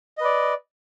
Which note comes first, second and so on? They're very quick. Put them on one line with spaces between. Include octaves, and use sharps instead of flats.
D#5 B4 D5